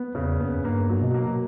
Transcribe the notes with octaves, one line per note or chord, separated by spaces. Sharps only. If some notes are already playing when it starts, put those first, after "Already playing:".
Already playing: B3
E2 C#3
F#2 B3
G2 A#3
F#3
B2
A#3
B2